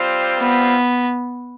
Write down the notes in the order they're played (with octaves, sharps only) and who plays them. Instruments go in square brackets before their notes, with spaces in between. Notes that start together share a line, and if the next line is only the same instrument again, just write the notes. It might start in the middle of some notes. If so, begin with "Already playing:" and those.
Already playing: [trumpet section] G3 C4 F4 C5
[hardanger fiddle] B3